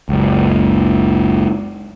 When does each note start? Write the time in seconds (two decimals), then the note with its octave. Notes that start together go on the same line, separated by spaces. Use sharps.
0.09 F#1 C#2